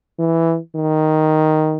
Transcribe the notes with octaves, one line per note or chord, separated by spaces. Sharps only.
E3
D#3